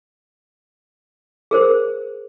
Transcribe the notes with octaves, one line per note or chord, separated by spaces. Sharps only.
G#4 A#4 C5